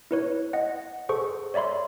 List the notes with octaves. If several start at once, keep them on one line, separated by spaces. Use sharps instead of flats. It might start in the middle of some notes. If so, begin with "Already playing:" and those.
E4 B4 C#5
D#5 F#5
G#4 A4 C5 C#6
C#5 D5 E5 B5 C6